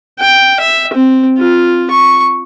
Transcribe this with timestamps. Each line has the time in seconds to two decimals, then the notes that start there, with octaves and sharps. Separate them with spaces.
0.20 G5
0.60 E5
0.94 C4
1.38 F4
1.91 C#6